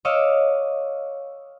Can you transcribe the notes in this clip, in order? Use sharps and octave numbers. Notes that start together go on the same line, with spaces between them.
C#5 D#5 F5 D6 E6